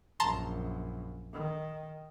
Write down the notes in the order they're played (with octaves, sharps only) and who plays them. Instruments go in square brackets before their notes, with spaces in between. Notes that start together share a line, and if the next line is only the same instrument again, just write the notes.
[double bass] A#1 F#2 [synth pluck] A5 A#5 C6
[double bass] D#3